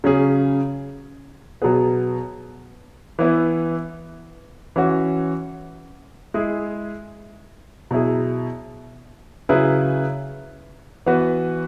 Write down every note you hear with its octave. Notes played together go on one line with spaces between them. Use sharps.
C#3 F#3 C#4 G#4
B2 F#3 B3 G#4
E3 B3 E4 B4
E3 C#4 F#4
G#3 E4 G#4
B2 F#3 E4 G#4
C#3 F#3 E4 G#4 B4
E3 B3 F#4 B4